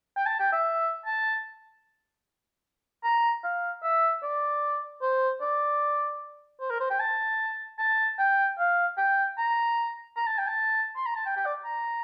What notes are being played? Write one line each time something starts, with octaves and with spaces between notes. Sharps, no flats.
G5
A5
G5
E5
A5
A#5
F5
E5
D5
C5
D5
C5
A#4
C5
G5
A5
A5
G5
F5
G5
A#5
A#5
A5
G5
A5
C6
A#5
A5
G5
G5
D5
A#5